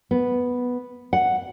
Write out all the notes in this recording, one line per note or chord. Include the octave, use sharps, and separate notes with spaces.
B3
F#5